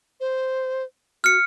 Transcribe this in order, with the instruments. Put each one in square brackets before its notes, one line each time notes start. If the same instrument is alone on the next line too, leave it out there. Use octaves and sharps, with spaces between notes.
[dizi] C5
[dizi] F#4 [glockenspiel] F6 C#7